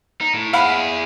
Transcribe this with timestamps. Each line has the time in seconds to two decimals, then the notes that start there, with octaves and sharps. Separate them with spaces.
0.21 D#4
0.34 A2
0.53 E4 G#4 F5 F#5 B5